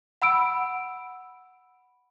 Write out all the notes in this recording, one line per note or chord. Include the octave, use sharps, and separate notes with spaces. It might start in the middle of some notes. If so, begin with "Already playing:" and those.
F#5 B5 E6 D7